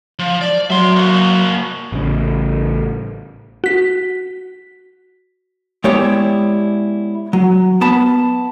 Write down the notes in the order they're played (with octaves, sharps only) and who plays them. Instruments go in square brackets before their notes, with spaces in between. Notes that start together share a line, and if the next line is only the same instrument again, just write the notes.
[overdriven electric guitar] F3
D5
[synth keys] F#3 [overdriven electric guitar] E5 C6
[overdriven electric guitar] A#3 F#4
[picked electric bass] A1 C#3
[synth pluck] F#4 B6
[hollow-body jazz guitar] G#3 B3 E4 G4 C#5 D5
F#3
B3 A5 B5